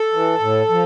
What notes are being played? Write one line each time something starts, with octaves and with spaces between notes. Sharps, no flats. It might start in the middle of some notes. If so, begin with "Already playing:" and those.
Already playing: A4
E3
A2
F3